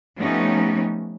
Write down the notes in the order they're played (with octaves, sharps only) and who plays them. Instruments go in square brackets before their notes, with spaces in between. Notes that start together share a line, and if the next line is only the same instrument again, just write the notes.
[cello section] F3 A3 B3 C#4 D#4 G4